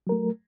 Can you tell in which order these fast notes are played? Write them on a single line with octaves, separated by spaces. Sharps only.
F#3 A#4 A3